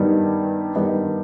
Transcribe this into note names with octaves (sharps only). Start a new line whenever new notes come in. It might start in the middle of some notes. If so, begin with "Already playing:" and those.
Already playing: G2 D#3 G3 B3 D#4
G2 D#3 G3 B3 D#4